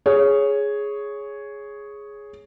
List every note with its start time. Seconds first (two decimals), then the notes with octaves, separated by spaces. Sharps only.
0.06 G#4 C#5